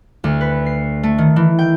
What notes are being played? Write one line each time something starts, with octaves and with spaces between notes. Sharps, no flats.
D2
B4
C7
A3
D#3
E3
G5